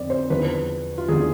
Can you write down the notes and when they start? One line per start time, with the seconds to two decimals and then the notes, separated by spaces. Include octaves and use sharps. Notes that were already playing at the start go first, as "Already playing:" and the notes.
Already playing: F2 D3 C4 D5
0.10 C5
0.30 E2 D3 F3 B4
0.98 F4
1.08 E2 D3 F3 G#4